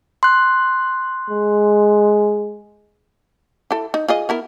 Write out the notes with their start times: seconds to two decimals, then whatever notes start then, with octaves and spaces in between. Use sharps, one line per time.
0.23 C6 F#6
1.30 G#3
3.71 E4 A4
3.94 D#4
4.08 F4 G#4 D#5
4.29 B3 E4 A#4